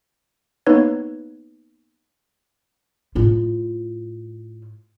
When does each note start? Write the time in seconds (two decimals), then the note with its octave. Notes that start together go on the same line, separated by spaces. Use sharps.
0.66 A#3 B3 D#4 B4 C#5 G#6
3.15 A2 F4